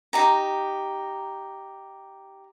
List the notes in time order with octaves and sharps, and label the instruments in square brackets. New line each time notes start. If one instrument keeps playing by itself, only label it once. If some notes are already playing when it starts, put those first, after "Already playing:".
[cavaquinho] D#4 G4 A#5